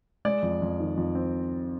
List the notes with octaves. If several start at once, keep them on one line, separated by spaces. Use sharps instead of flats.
G#3 D5
F2
F2
D#3
F2
C4